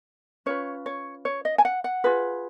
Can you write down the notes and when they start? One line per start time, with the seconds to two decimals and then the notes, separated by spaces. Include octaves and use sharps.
0.46 C#4 F4 B4 C#5
0.86 C#5
1.25 C#5
1.45 D#5
1.58 G#5
1.65 F#5
1.84 F#5
2.04 F4 G#4 B4